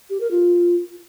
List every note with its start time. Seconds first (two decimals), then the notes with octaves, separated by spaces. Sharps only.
0.10 G4
0.20 A#4
0.31 F4